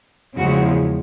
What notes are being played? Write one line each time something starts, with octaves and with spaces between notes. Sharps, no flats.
E2 C#3 F3 G#3 F#4